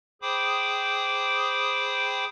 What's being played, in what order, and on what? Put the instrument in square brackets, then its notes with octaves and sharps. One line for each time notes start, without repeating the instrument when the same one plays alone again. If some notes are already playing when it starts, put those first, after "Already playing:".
[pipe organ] G#4 C5 G5 B5 D6 D#6